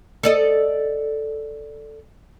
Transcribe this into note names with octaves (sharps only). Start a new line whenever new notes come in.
A4 D5 D#5